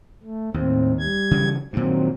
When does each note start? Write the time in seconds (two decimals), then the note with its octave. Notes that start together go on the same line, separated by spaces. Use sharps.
0.23 A3
0.54 D#2 A2 C4
0.99 G3 G#6
1.31 C#3 E3 F#3
1.73 G2 A#2 D#3 F#3 C4